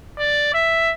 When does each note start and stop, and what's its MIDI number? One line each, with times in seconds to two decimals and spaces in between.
0.19 0.50 74
0.54 0.93 76